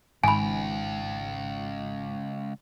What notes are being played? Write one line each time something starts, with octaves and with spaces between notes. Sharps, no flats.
G#1 C#2 G#2 G#5 B5